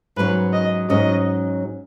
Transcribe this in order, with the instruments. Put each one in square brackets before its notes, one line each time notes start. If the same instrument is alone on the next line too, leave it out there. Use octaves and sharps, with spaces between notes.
[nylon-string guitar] G#2 F#3 C#4 [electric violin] B4
[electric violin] D#5
[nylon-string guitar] G#2 F#3 C#4 [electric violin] D#5